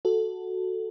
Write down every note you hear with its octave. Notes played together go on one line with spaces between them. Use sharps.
F#4 A4